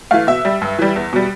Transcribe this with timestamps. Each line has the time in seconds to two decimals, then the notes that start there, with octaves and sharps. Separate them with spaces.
0.11 E3 A3 F5
0.27 B2 E5
0.45 G3
0.62 G2
0.79 E3 G3
0.96 E2
1.13 B2 G3